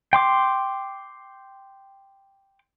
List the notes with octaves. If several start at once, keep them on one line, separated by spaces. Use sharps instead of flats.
G5 C6 D6